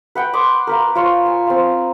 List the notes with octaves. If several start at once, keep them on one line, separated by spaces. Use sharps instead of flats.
B4 F#5 G5
B5 C6 D6 D#6
A#4 B4 F5
F4 C5 C#5 F5
G#5
C4 F5